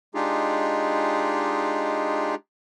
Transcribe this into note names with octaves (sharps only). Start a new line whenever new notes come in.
G#3 D4 D#4 F4 G4 G#4